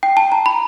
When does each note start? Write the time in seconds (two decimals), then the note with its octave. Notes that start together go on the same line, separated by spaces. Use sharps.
0.03 G5
0.17 A5
0.32 A#5
0.46 B5